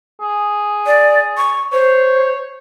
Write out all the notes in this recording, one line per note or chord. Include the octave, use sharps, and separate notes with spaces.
G#4
D5
C#6
C5 C#5